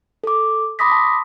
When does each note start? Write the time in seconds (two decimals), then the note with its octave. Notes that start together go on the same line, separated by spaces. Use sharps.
0.24 A4 D6
0.79 B5 C6 D6 D#6 A#6 B6
0.92 A5